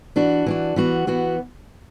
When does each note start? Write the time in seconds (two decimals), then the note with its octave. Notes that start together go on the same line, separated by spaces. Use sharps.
0.16 E3 D4 F#4
0.46 E3 D4 F#4
0.76 E3 B3 F#4
1.07 E3 B3 F#4